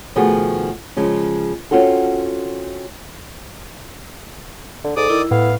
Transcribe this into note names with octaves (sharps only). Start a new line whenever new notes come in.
B2 D#3 F3 A3 F#4 G#4
C#3 F3 G#3
C4 C#4 F4 F#4 A4
D3
G#2 A4 D5 D6 D#6
D#3 E4
A2 B3 F5